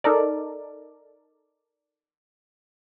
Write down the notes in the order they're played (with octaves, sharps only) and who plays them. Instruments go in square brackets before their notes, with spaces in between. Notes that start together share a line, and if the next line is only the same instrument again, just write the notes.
[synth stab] D#4 A4 A#4 D5